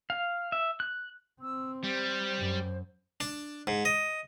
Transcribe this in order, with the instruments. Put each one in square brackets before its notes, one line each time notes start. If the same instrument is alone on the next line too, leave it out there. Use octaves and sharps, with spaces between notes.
[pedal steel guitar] F5
E5
F#6
[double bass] C4 [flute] E6
[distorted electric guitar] G3 [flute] C5
[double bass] F#2
[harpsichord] D4
G#2
D#5